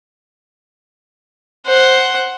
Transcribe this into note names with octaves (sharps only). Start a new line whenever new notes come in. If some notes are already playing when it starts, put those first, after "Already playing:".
C5 F#5